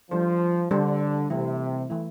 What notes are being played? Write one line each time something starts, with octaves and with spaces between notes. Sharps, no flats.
F3 G3 D4 A4 C5
D3 G3 D4 A4 C5
C3 E3 A3 E4
E3 A3 E4